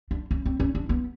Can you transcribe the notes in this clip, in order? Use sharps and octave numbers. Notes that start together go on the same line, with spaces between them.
D4
C#4
C4
C#4
D4
B3